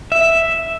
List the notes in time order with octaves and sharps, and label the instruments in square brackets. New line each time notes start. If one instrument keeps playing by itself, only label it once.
[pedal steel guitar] E5